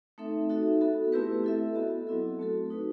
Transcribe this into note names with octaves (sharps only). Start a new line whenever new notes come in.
A3 C4 D#4 A4 E5
D#4 F#4 A4 E5
B3 F#4 A4
A3 C4 E4 G4 B4
E4 A4 E5
B3 F#4 A4 D#5
F#3 C4 E4 A4
A3 C4 F#4 A4
D#4 F#4 B4